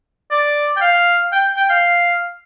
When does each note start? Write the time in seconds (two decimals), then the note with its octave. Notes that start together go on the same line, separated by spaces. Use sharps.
0.31 D5
0.77 G5
0.81 F5
1.32 G5
1.56 G5
1.70 F5